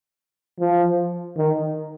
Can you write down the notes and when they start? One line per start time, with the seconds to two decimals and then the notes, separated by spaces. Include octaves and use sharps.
0.59 F3
1.37 D#3